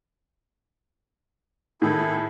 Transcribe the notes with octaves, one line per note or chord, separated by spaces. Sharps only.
A2 D#3 E4 G#4 A4